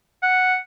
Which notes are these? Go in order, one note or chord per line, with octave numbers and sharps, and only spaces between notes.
F#5